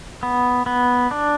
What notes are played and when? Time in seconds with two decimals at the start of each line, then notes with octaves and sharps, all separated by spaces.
0.23 B3
0.66 B3
1.11 D4